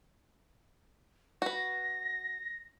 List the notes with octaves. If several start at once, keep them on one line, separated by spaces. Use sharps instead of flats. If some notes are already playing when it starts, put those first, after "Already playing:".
F#4 B4 A#6